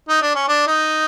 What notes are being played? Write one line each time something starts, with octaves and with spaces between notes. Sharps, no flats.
D#4
D4
C#4
D4
D#4